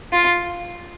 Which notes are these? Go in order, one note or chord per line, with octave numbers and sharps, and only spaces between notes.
F4